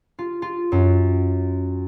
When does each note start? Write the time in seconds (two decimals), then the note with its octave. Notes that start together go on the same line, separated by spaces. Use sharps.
0.19 F4
0.42 F4
0.72 F#2